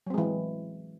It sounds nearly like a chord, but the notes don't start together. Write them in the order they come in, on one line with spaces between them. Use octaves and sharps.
F#3 C4 G#3 E3